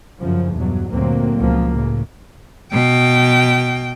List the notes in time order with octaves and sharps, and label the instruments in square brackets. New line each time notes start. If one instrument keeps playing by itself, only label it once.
[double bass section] F#2 C#3 F3
E2 G2 B2 F#3
D2 G2 A#2 F#3 A#3 C4
C#2 B2 F3 F#3 A#3
A2 C#3
[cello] B2 G5